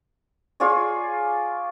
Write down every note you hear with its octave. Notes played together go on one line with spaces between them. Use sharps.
F4 G#4 C#5 D5